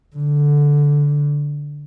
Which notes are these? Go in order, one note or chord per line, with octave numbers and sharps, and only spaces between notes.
D3